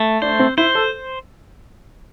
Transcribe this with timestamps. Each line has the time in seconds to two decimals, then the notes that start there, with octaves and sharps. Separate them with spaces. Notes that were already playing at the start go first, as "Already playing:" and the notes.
Already playing: A3
0.22 D4 C5
0.39 C4
0.58 E4 C5
0.75 A4